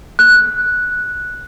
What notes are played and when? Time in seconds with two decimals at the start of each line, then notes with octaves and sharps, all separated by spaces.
0.19 F#6